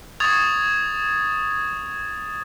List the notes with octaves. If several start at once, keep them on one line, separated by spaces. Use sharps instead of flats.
C#6 D#6 G#6 A6 F7